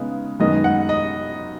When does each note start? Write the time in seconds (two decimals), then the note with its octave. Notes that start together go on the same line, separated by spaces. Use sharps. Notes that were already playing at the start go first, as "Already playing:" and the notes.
Already playing: C#3 G#3 B3 D#4
0.40 F#2 D#3 G#3 B3 D#5
0.64 F#5
0.89 D#5